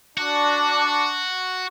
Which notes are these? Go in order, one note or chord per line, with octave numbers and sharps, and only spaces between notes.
D4 F#4